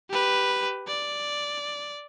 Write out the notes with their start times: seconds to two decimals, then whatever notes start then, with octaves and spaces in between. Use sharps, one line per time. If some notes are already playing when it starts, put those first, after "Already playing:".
0.10 G4 B4
0.87 D5